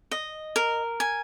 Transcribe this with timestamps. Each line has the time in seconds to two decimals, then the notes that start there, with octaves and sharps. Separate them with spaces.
0.11 D#5
0.56 A#4
1.00 G#5